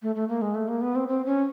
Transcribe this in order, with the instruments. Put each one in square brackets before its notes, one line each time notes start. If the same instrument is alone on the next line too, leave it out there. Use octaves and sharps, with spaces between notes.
[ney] A3
A3
A#3
G#3
A3
A#3
B3
C4
C4
C#4